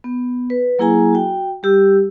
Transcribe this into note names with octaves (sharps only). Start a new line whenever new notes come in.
B3
B4
F#3 A#3 E4 G#4 G#5 A#5
F#4 G5
G3 G4 E6